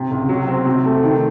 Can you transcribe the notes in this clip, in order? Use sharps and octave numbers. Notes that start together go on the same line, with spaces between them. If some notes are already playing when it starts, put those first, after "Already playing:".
Already playing: C3
C#2
F#3
C4
C3
A3
D#3